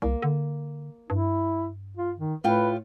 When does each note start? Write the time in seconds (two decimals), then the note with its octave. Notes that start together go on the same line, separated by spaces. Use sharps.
0.02 C2 A#3
0.22 D3
1.10 G2 E4
1.97 F4
2.19 D#3
2.44 A2 F4 B4 G5